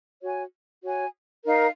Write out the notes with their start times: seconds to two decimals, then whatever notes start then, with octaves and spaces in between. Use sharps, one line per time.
0.21 F#4 C#5 G#5
0.83 F#4 C#5 G#5
1.45 D#4 A#4 F5